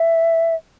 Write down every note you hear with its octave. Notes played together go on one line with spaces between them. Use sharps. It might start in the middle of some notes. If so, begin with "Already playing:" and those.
Already playing: E5